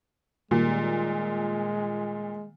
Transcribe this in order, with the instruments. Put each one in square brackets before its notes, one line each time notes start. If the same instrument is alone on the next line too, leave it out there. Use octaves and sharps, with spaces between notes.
[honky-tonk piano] A#2 [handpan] D#3 G3 A#3 [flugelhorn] G#3